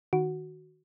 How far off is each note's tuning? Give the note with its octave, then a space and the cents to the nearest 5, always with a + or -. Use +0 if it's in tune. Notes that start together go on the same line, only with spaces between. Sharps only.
D#3 +0 F#4 +0